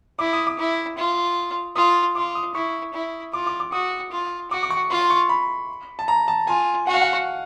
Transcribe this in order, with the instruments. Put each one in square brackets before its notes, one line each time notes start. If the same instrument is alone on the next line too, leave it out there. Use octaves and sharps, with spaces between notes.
[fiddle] E4 [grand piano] D6
[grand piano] D#6
D6
[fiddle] E4
F4
[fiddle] F4 [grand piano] D#6
[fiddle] F4 [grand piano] D6
[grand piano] D#6
[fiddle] E4 [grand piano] C#6
[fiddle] E4
[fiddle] F4 [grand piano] D6
[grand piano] D6
D6
[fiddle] F#4 [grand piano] D#6
[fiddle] F4
[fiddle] F#4 [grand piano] D6
[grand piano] D6
C#6
[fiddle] F4 [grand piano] C6
[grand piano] C#6
B5
A5
A#5
A5
[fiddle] F4 [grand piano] G#5
[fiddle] F#4 [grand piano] F#5
[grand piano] F5
F#5